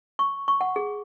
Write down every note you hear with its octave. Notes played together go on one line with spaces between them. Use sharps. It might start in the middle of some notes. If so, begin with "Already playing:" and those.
C#6
C#6
F#5
G#4